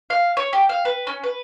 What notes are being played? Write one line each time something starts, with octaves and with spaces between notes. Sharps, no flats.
F5
C#5
G4
F5
B4
C#4
B4